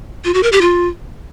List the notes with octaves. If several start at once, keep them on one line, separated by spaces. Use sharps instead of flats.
F4
F#4
A#4
G4
F4